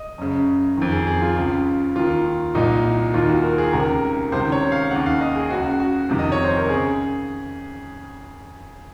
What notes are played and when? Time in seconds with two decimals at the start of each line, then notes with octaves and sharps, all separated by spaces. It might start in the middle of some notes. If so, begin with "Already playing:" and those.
Already playing: D#5
0.18 F#2 C#3
0.77 F2 D#3
0.92 G#4
1.07 G#4
1.21 F4
1.36 C#2 C#3
1.95 D#2 D#3 F4
2.55 C2 A#2 D#4
3.14 D#2 D#3 F4
3.29 F#4
3.43 A#4
3.58 G#4
3.73 C#2 C3 D#3 A#4
4.32 C#2 C3 D#3 C5
4.52 C#5
4.72 F5
4.91 D#2 C#3 F#5
5.06 F5
5.21 D#5
5.36 G#4
5.50 C#2 C#3 F#4
5.80 F#4
6.09 F2 C3 D#3
6.19 D#5
6.32 C#5
6.44 C5
6.57 A#4
6.69 C#3 G#4